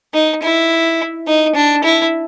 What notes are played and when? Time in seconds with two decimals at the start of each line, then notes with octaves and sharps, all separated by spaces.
0.14 D#4
0.42 E4
1.27 D#4
1.55 D4
1.84 E4